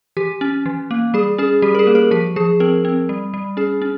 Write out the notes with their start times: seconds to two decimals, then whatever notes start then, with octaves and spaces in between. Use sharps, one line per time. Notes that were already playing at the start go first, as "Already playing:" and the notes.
0.17 E3 G4
0.41 C#4
0.66 E3
0.91 A#3
1.14 G3 G#4
1.38 C#4 G#4
1.62 G3 G4
1.75 A#4
1.79 G#4
1.87 A#3
1.95 A#4
2.11 F3 G4
2.36 F3 G#4
2.60 C4 A#4
2.85 C4
3.09 G3
3.34 G3
3.57 C#4 G#4
3.82 C#4